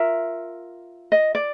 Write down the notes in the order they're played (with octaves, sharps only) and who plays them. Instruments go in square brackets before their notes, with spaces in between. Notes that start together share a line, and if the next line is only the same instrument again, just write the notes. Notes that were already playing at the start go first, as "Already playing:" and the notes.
Already playing: [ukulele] F4 A#4 E5
D#5
D5